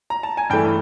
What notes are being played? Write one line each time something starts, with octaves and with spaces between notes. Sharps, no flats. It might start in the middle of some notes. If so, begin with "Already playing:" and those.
A#5
A5
G#5
G2 E3 A3 G5